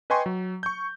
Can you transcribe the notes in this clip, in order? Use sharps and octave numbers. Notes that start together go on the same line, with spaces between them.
B4 D#5 G5 G#5 C6 C#6
F#3
C#6 G6